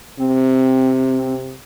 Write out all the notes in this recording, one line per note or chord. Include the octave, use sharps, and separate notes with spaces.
C3 C4